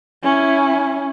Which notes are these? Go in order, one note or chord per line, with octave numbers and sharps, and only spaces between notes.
C#4 E4